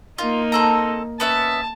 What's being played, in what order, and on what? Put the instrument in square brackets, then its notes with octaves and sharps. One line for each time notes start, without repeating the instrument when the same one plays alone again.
[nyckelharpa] A#3 D#4 [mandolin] F4
[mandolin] C4 A4 A#5
[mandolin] B3 C#4 E5 [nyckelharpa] A5